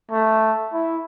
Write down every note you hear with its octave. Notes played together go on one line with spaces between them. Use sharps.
A3
E4